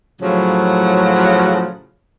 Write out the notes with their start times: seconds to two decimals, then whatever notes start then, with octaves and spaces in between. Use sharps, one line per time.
0.21 A2 C#3 F3 F#3